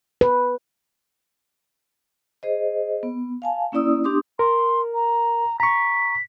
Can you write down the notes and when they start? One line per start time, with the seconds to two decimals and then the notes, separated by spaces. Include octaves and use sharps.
0.21 B4
2.43 G#4 C5 D#5
3.03 B3
3.42 F5 G#5 A5
3.72 A#3 C#4 E4 D5 D#6 E6
4.04 B3 D4 G4 C6 D6 D#6
4.39 A#4 C6
4.95 A#5
5.60 A#5 C#6 B6